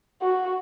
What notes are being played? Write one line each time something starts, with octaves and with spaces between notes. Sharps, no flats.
F#4